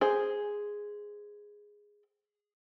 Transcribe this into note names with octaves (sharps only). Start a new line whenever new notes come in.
G#4 C5